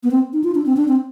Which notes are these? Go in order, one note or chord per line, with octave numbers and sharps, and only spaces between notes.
B3
C4
D#4
F4
D4
C4
D4
C4